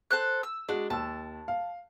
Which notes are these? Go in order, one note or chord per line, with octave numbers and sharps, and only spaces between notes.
A4 C5 F#6
E6
G#3 D4 F#4
D#2 A5 E6
F5